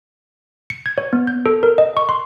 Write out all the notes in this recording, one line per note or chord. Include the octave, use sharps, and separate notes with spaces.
C#7
G#6
C#5
B3
G6
A4
A#4
D#5
C#6
C6